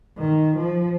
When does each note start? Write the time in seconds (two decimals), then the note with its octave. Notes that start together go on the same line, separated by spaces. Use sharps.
0.18 D#3
0.57 F3